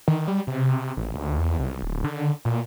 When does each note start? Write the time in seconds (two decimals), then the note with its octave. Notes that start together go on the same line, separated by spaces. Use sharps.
0.08 D#3
0.28 G3
0.47 C3
0.97 A1
1.15 D2
1.38 E2
1.59 C2
1.83 D1
2.04 D3
2.45 A#2